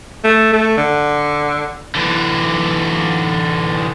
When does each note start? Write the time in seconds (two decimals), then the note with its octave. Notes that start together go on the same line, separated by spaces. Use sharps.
0.25 A3
0.53 A3
0.78 D3
1.95 D3 E3